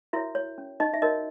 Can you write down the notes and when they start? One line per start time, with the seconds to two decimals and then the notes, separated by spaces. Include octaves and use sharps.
0.13 E4 F#4 A#4 C#5 E5
0.35 C#5
0.58 C#4
0.80 D#4 D#5
0.94 E5
1.02 D#4 F#4 A#4 C#5 D#5